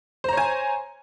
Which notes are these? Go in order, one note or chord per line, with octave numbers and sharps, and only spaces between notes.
C5 C#5 G#5 A#5